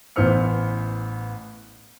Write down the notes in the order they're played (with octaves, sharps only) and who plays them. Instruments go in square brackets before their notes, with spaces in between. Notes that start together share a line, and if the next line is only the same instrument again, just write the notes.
[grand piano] A1 E3 B3 C5 F6 C#7